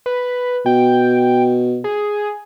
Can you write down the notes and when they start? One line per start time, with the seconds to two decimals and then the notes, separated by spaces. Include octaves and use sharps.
0.06 B4
0.66 B2 G5
1.84 G#4